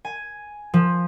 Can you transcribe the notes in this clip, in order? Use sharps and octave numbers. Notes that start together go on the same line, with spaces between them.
G#5
F3